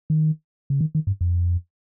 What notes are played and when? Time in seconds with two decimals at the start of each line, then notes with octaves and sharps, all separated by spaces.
0.10 D#3
0.70 C#3
0.81 D#3
0.95 D#3
1.07 G2
1.21 F2